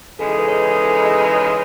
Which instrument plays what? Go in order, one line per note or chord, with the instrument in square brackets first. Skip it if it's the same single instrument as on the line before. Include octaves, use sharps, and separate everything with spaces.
[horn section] C#3 E3 G#3 D#4 [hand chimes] A4
[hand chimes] G#4
B4
C#5
B4
A4
G#4
B4
D#5
B4
C#5